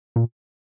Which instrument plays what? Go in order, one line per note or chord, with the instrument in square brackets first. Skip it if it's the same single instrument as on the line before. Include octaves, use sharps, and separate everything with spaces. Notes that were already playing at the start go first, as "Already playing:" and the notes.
[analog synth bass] A#2